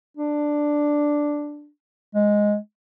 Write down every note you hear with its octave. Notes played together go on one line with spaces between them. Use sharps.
D4
G#3